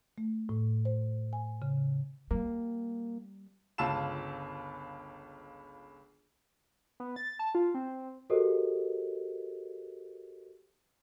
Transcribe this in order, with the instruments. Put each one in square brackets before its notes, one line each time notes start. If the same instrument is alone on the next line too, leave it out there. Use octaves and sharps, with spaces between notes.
[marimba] A3
A2
C5
G#5
C#3
[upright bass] G3 [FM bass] A#3
[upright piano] G1 C#2 F4 A5 E6 E7
[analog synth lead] B3
A6
A5
F4
C4
[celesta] F#4 G4 A4 A#4 C5 D#5